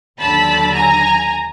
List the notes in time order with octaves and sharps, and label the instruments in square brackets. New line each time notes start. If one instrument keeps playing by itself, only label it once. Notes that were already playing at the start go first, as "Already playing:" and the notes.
[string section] D#2 D3 F#3 A5 B5
G#5 A#5